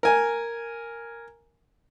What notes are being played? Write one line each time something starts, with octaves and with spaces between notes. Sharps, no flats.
A#4 G#5